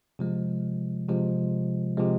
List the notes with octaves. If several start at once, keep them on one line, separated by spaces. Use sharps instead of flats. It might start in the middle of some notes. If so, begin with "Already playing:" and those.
C3 F3 G#3
C3 F3 G#3
C3 F3 G#3